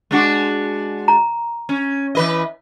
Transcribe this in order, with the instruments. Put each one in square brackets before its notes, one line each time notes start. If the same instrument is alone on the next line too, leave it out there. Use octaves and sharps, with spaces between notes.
[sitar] G#3 D4 F#4
[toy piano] A#5
[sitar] C#4
E3 B4 D#5